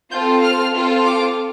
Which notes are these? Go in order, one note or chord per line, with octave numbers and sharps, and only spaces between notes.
C4 F4 A4 G6
F6
C4 F4 A4
D6